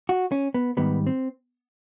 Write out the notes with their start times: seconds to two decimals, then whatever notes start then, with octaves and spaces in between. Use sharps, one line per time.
0.09 F#4
0.32 C#4
0.54 B3
0.77 G#2 D#3 G3 B3
1.07 C4